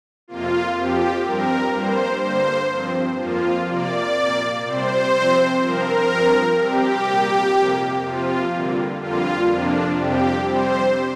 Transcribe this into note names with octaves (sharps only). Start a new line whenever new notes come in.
F2 C3 A#3 F4
F2 F3 C4 G4
G2 G3 C4 A#4
G2 G3 A#3 C5
G2 D3 A#3 C5
G2 F3 C4
F2 F3 A#3 F4
C3 A#3 D5
A#2 A#3
C3 G3 C4 C5
C3 F3 C4
G2 F3 C4 A#4
G2 F3 C4
C3 G3 C4 G4
A#2 G3 A#3
F2 C3 A#3
C3 F3 C4 F4
G2 D3 G3 A#3
F2 D3 G3 A#3 F4
F2 C3 F3 A#3 D4
F2 C3 G3 C4 G4
C3 G3 C4 C5